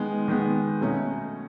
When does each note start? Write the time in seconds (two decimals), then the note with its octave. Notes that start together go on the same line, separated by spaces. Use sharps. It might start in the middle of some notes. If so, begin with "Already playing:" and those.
Already playing: D#3 G#3 B3
0.28 D#3 G#3 B3
0.81 B2 F#3 A3 C#4